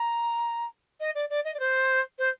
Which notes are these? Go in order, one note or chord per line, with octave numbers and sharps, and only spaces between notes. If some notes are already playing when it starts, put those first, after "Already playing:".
Already playing: A#5
D#5
D5
D5
D#5
D5
C5
C5